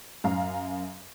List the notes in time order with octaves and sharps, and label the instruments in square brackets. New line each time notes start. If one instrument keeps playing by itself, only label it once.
[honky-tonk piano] F#2 F5 A#5